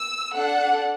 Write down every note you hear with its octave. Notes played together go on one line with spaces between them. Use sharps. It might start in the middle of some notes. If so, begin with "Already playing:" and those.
Already playing: E6
D4 A4 F#5